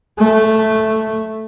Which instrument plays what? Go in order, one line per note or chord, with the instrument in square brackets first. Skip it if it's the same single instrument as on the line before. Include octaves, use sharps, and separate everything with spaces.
[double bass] A3